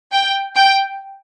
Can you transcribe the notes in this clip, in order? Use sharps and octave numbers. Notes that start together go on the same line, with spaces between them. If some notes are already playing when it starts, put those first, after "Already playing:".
G5
G5